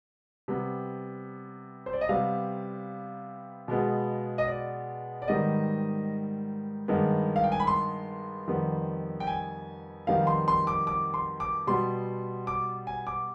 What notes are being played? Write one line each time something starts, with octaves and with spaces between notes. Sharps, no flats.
C3 G3 B3
C5
D5
D#5
C3 G3 B3 F5
B2 G#3 B3
D#5
D5
D5
G#2 D#3 G3 B3 D#5
G2 D#3 G#3 B3
F5
G5
G#5
B5
C6
F2 D#3 G3 B3
G5
G#5
F2 D#3 G3 B3 F5
C6
C6
D6
D6
C6
D6
B2 G3 B3 C6
D6
G#5
D6